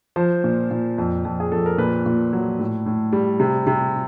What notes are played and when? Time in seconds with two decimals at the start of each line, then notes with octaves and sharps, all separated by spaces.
0.16 F3 C5
0.44 A#2
0.71 A#2
0.98 F2
1.25 F2
1.40 G#4
1.52 F2 A4
1.66 A#4
1.78 A#2 B4
2.06 A#2
2.33 F#3
2.59 A2
2.86 A2
3.12 G3
3.40 C3
3.67 C3